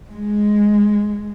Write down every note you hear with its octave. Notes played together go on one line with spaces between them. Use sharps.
G#3